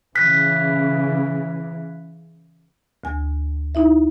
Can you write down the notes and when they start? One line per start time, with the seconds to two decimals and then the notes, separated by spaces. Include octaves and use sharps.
0.15 C#3 E3 F#6 B6
3.04 D2 G#5
3.75 D#4 E4 E5